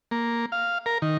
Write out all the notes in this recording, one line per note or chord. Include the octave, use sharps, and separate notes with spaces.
A#3
F5
A#4
D#3